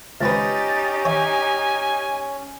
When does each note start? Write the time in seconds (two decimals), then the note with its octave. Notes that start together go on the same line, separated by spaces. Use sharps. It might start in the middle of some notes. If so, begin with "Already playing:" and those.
0.21 C#2 C4 C#4 D#4 G4 B4 A6
1.05 C#5 E5 G#5